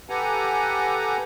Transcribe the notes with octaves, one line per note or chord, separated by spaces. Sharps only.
G4 A4 B4 F#5 G#5 A#5